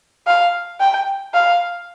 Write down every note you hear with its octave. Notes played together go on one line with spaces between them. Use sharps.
F5
G5
F5